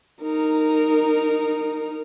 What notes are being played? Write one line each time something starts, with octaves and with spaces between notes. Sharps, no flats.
D#4 A#4